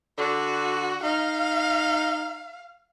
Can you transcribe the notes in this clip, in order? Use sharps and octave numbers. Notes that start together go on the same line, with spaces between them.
D3 F#4
D#4 F5